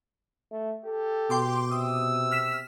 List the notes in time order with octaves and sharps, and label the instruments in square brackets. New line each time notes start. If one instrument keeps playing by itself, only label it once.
[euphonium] A3
[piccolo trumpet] G4 [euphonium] A4
[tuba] B2 [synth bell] G5 C6 D6
[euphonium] C3 [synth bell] D#6 [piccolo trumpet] E6
[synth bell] F6 B6 E7